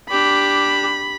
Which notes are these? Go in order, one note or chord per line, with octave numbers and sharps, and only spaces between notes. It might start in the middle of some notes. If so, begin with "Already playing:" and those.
D4 G4 B5